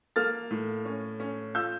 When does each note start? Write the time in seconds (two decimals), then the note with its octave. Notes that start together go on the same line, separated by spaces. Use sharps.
0.16 A#3 F6 A6
0.51 A2
0.85 C#4
1.20 C#4
1.55 F4 E6 G6